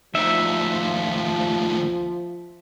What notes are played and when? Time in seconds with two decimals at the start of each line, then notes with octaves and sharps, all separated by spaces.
0.15 D2 D#3 F3 E5